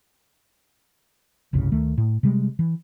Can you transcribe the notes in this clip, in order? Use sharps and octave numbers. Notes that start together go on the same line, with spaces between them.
F1 C2 G2 C#3
D2 D#3 A3
A2
C3 G3 G#3
E3